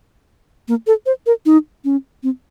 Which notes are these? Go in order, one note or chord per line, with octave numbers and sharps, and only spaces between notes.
A#3
A4
C5
A#4
D#4
C#4
C4